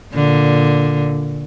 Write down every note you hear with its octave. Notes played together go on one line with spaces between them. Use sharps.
A#2 D3